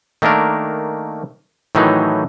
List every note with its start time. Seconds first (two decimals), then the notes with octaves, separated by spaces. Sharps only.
0.22 D#3 A3 A#3 D4 A#4
1.75 A2 D#3 E3 F#3 D#4